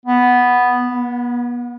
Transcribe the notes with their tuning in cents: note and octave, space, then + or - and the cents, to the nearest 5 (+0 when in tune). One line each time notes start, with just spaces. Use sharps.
B3 +0
B3 -35